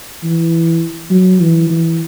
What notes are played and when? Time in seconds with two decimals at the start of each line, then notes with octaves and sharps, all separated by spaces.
0.23 E3
1.11 F#3
1.41 E3
1.70 E3